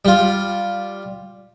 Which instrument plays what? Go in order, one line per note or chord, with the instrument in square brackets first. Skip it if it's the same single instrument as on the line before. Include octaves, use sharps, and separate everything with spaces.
[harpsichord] G3 F4